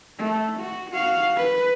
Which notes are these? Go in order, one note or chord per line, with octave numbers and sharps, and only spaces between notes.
A3
F#4
F#4 F5
B4